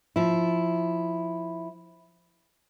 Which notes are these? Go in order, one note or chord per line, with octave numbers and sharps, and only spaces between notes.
F3 E4